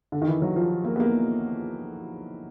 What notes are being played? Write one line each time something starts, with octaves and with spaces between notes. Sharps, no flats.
D3
D#3
E3
F#3
F3
A#3
B3
A#3